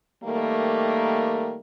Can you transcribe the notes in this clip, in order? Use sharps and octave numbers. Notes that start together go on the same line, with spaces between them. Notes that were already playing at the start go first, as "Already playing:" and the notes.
D#3 G3 A3 A#3